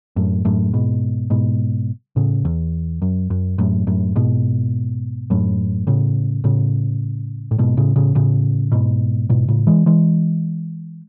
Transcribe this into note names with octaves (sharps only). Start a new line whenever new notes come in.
F#2 A2
F#2 A2
G#2 B2
G#2 B2
A2 C#3
E2
F#2
F#2
F#2 A2
F#2 A2
G#2 B2
F#2 A2
A2 C#3
A2 C#3
A2
G#2 B2
A2 C#3
A2 C#3
A2 C#3
G#2 B2
G#2 B2
A2 C#3
E3 G#3
E3 G#3